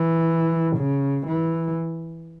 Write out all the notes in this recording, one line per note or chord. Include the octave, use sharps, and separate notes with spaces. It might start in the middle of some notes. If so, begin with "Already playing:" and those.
Already playing: E3
C#3
E3